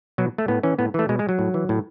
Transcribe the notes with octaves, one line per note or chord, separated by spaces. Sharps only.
B2 F#3
A3
A2 B3
E3 C#4
A2 B3
E3 A3
B2 G#3
G#3
F#3
A2
E3
A2